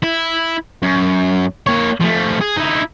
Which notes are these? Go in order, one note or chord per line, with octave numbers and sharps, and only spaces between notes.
E4
F#2
A#3 C#5
F3 A3
G#4
D#4 E4